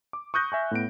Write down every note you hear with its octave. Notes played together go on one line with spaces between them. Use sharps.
D6
C#6 D#6 F#6 G6 A#6
E5 G#5 C#6
A2 B3 D7